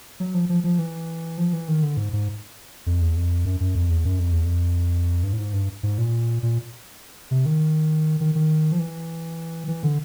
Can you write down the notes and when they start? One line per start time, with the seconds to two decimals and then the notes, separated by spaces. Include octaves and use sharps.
0.20 F#3
0.34 F3
0.49 F3
0.64 F3
0.79 E3
1.38 F3
1.53 E3
1.68 D#3
1.83 D3
1.97 G#2
2.13 G#2
2.86 F2
3.01 E2
3.16 F2
3.45 F#2
3.60 F#2
3.75 F2
3.90 E2
4.05 F#2
4.19 F2
4.32 E2
4.45 F2
5.23 G2
5.33 A2
5.39 G#2
5.53 G2
5.83 G#2
5.98 A#2
6.43 A#2
7.31 C3
7.46 D#3
8.21 D#3
8.35 D#3
8.72 F3
8.79 E3
9.68 E3
9.83 D3